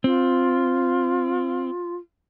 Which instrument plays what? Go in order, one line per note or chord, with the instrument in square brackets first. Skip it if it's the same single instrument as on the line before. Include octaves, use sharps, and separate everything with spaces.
[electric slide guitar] C4 [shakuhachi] F4